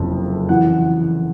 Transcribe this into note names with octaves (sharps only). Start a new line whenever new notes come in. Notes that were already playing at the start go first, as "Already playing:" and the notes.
Already playing: F#1 F2 C3
E3 F#5